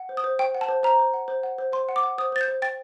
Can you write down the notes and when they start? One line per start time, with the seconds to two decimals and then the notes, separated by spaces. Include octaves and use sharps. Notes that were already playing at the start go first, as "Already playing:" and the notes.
Already playing: F#5
0.09 C5
0.17 D#6
0.24 C5
0.39 C5 G5
0.55 F#5
0.61 A5
0.69 C5
0.83 C5 A#5
0.99 C5
1.14 F#5
1.28 C5
1.43 F#5
1.58 C5
1.73 C5 C6
1.89 F#5
1.96 D6
2.03 F#5
2.18 C5 D#6
2.32 C5 A6
2.41 G6
2.48 C5
2.62 G5 A6